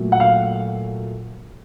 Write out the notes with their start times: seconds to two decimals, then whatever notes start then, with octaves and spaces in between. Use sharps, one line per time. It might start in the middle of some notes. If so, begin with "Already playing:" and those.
Already playing: A#2 F#3 A3
0.12 F#5
0.20 F5